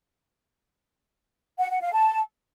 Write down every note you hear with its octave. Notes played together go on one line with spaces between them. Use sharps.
F#5
F#5
F5
A5